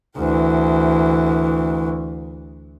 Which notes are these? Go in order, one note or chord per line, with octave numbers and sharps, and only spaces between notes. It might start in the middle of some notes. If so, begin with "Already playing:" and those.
D2 E3